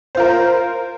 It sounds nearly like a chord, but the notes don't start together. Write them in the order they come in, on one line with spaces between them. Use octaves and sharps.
C5 F4 A#4